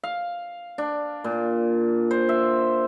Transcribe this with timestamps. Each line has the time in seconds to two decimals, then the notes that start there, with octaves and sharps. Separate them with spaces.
0.03 F5
0.78 D4
1.24 A#2
2.11 C5
2.29 E5